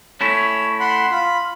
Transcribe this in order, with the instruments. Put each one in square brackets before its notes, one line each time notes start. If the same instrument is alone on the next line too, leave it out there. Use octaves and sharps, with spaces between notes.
[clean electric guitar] A3 C#4 E4 [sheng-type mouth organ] C#5
[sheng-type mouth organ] F#5 B5 C6
F4 B5